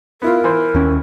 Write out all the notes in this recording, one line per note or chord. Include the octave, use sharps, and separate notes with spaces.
B3 E4 F4 A#4
E3 C5
D#2 C#4